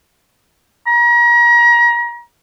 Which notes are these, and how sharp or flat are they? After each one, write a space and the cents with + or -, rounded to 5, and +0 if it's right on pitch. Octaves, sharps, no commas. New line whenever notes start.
A#5 +35